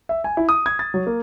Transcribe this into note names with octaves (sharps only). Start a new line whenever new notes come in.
E5
G#5
E4
D#6
G#6
A6
F#3
A#3